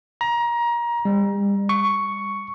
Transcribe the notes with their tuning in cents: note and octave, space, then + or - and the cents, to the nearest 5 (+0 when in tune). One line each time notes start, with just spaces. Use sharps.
A#5 +25
G3 +40
C#6 +5